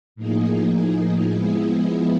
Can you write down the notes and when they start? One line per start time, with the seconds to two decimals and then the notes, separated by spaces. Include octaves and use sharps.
0.16 A2 F3 A#3 D#4 G#4
1.32 F3 G#3 B3 E4 G#4